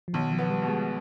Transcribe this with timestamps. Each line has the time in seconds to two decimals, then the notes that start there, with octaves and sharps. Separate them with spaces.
0.08 F3
0.13 B1 D#3
0.32 F3
0.38 B3
0.50 G3
0.62 B2
0.68 G#3